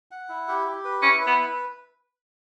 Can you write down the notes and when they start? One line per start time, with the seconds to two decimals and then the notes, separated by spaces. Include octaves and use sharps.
0.11 F#5
0.29 E4
0.48 G4
0.66 G4
0.85 B4
1.02 C#4 E4
1.21 B4
1.27 B3